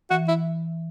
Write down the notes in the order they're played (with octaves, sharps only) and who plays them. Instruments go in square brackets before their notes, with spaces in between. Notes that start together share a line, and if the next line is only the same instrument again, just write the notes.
[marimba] E3 [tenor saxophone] F#4
[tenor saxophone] E4